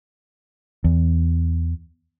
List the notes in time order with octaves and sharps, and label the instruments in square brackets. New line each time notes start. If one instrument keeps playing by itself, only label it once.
[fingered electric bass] E2